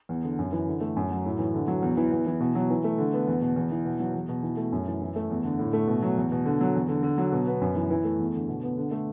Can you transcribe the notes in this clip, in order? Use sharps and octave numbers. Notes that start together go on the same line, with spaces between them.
E2
D3
F#2
E3
D3
A3
F#2
F#3
A2
E3
D3
F#3
E2
E3
E2
E3
B2
F#3
E3
A3
D3
B3
E2
B2
E2
E3
B2
F#3
E2
B2
E3
A3
F#2
E3
E3
A3
E2
D3
A2
A3
B2
F#3
E2
B2
D3
F#3
E2
D3
D3
F#3
B2
B3
F#2
E3
E3
A3
E2
D3
B2
B3
D3
A3